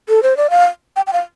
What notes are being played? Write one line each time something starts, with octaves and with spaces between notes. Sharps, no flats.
A4
C5
D5
F5
G5
G5
F5